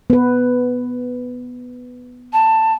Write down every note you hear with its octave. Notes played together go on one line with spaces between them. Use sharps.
B3 B4
A5